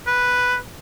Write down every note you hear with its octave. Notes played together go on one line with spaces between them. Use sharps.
B4